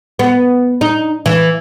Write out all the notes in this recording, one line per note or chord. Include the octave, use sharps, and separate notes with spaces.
B3
D#4
E3